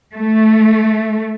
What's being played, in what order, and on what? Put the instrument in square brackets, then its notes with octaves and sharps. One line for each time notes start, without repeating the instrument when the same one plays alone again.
[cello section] A3